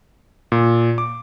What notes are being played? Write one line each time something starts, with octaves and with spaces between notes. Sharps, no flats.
A#2
D6